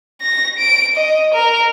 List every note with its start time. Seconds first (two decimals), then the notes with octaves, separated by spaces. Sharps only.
0.22 A#6
0.59 D7
0.97 D#5
1.34 A#4